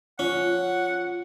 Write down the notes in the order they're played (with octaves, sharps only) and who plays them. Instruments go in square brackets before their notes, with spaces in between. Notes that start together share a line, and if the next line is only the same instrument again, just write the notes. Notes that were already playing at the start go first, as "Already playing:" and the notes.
[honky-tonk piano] F3 [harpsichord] C#4 [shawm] F#5